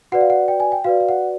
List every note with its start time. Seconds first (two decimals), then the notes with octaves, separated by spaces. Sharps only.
0.12 F#4 B4 D5 F#5
0.21 F5
0.30 F#5
0.48 G5
0.60 G#5
0.72 G5
0.84 F#4 B4 D5 F5
1.00 F5
1.09 F#5